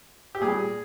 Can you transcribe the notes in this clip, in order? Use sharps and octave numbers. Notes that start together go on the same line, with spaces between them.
G4
A#2 G3 G#4